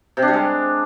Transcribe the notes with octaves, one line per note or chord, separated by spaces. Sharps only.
C3
D4
G3
G#3